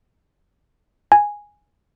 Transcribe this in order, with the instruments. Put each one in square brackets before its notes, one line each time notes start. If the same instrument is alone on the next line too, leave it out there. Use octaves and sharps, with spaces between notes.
[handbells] G#5